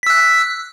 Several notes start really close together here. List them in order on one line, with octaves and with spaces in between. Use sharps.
B6 E6 F#6